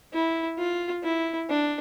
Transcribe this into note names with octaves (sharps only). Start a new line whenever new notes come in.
E4
F4
E4
D4